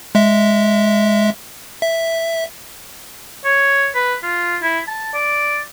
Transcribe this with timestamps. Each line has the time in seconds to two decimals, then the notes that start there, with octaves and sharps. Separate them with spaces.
0.15 G#3 E5
1.82 E5
3.45 C#5
3.95 B4
4.23 F4
4.62 E4
4.88 A5
5.14 D5